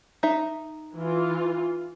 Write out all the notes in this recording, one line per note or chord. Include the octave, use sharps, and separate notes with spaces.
D#4 E5
E3 F4